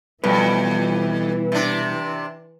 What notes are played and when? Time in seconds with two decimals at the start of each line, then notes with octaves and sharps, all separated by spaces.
0.24 F2 B2 E3 G3 B4
1.52 C3 D4